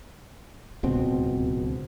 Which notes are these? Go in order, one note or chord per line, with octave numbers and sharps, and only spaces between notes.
D1 C#2 B2 C4